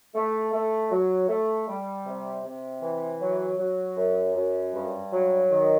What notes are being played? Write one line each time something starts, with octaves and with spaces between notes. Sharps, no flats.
A3
A3
F#3
A3
G3
C3
C3
E3
F#3
F#3
F#2
F#2
G2
F#3
D#3